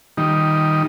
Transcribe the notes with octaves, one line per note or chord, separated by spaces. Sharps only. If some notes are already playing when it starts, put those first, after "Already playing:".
D#3 G3 D#4